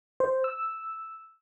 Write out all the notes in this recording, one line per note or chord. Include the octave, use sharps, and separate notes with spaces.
C5
E6